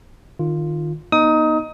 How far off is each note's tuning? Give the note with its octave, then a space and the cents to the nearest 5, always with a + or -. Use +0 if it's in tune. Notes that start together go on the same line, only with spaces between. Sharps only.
D#3 -25 F4 +0
B3 -40 D#4 +0 D#6 +25